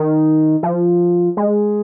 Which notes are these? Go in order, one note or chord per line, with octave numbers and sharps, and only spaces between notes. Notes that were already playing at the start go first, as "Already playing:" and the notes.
Already playing: D#3
F3
G#3